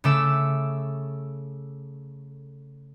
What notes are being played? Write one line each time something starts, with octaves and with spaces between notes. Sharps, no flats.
C#3 A3 A4 D6 E6